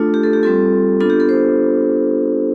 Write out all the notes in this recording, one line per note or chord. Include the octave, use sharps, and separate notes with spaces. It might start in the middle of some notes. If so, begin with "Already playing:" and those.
Already playing: A3 D4 F4 A4
G4
A4
G4
G3 C4 F4 A4
B3 D4 F4 A4
G4
A4
C5